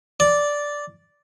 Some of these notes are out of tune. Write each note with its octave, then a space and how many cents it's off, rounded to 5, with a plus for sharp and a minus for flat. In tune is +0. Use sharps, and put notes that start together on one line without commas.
D5 -5